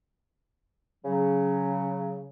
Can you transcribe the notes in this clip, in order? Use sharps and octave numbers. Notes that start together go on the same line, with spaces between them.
C#3 F#3